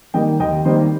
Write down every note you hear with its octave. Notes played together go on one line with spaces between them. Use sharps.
D#3 G3 A#3 D#5 G5
D#2 D#5 G5
D#3 G3 A#3 C5 D#5